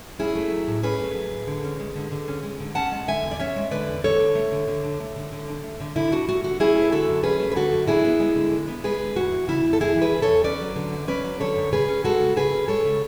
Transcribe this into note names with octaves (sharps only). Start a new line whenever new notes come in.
C#4 E4 G#4
A3
F#3
A2
C#4 G#4 B4
A3
F#3
A2
D3
C#4
G#3
D3
D3
C#4
G#3
D3
C#4 F#5 A5
G#3
D3 E5 G#5
E2
D5
C#4 C#5 E5
G#3
D3 B4 D5
E2
D3 A4 C#5
D4
A3
D3
D3
D4
A3
D3
D3
D4
A3
D3
D3 E4
D4 F#4
A3 F#4
D3 F#4
C#4 E4 G#4
A3
B4
D3 F#4 A4
F#2
C#4 G#4 B4
A3
B4
D3 F#4 A4
F#2
D4 E4 G#4
B3
G#3
D3
D4
B3
G#3 G#4 B4
D3
E2 F#4
E3
C#3 E4
E2
A4
E2 E4 G#4
E3
G#4 B4
C#3
A4 C#5
E2
C#4 B4 D5
F#3
D3
F#2
C#4 B4 D5
F#3
D3 A4 C#5
F#2
C#3 G#4 B4
C#4
G#3 F#4 A4
C#3
C#3 G#4 B4
C#4
G#3 A4 C#5
C#3